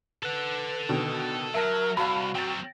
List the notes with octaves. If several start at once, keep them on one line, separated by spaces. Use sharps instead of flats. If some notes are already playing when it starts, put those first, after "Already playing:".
A4 B4 F#5
B2 D3 D#3
F#3 A#4 E5 A5 A#6
C2 F#4 F5 A5 B5
F#3 C4 G5 A6